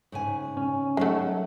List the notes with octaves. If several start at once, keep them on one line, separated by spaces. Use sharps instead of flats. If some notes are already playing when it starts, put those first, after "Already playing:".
G#2 C#3 G#5
C#4
D#3 F#3 A3 C#5 F#5